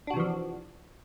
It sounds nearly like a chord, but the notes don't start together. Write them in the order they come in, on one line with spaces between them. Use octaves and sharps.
D4 F#4 C3 E3 F3